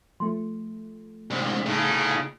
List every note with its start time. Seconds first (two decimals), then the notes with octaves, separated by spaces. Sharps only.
0.20 F3 A3 C6
1.31 C2 G#2
1.66 A2 C#3 D#4